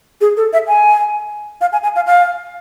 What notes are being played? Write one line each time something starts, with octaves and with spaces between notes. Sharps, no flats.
G#4
A4
E5
G#5
F5
G#5
G#5
F5
F5